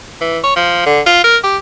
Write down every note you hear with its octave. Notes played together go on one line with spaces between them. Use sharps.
E3
C#5
F3
D3
F4
A#4
G4